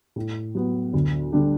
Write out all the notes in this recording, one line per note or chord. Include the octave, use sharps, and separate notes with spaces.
A2
F#3 B3
D2
D3 G3 D4 G4